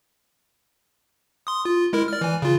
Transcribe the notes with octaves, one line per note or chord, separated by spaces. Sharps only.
C6 D#6
F4
G#3 E4 A#4
D5 F6
E3 G#5
C#3 F4